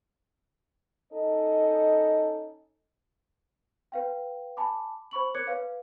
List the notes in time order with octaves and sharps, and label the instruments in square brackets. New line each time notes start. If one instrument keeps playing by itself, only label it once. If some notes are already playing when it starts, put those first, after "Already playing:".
[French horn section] C#4 D#4 A4 D#5
[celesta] B4 F5 G5
G#5 A5 B5 D6
C5 B5 C#6 F#7
A#4 C#5 D6 F#6 G#6 C#7
B4 F5